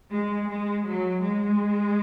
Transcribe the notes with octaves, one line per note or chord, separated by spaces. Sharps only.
G#3
G#3
F#3
G#3